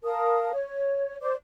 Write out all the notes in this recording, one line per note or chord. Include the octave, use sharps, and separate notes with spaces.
A#4 F5 A5 D#6
C#5
C5 D5 D6